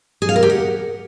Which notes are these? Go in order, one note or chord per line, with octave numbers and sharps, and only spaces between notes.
G#4
F5
A#4
G4
F#5